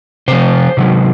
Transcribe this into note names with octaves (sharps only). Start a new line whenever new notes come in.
C3 F3 C5
C3 D#3 F#3